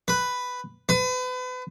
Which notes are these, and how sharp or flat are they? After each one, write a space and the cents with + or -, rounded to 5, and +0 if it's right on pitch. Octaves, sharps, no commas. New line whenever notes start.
B4 +5
B4 +35